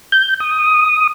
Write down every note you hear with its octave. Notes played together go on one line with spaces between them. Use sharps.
G6
D#6